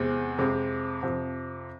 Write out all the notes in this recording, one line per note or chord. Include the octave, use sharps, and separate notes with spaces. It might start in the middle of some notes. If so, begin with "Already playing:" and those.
Already playing: E2 C3 G#3 C4
F2 C3 G#3 C4
F2 C3 F3